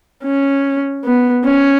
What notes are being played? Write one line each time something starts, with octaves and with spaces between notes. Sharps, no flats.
C#4
B3
C#4